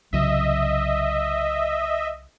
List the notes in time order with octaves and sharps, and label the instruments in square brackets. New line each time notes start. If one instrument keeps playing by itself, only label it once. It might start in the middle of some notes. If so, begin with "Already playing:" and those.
[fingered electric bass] C2 C#3 F#3 [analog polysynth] D#5 E5